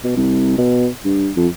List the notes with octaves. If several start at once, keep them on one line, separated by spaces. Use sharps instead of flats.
B2
C2
B2
G2
F2